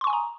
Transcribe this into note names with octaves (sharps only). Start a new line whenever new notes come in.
G#5 A#5 C6 C#6 D#6